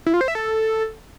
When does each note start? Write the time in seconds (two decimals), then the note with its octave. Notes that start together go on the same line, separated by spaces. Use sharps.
0.06 E4
0.14 F4
0.21 C5
0.28 E5
0.35 A4